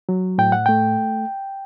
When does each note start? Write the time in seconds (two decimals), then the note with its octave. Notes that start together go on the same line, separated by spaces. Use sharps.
0.09 F#3
0.38 A2 G5
0.52 F#5
0.66 A3 G5